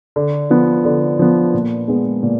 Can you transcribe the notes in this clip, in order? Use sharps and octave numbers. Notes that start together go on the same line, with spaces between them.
D3
F3 B3
D3
F3 B3
A#2
G#3 B3
A#2